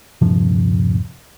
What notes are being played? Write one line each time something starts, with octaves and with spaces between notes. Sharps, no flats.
D#1 G2 C3 F3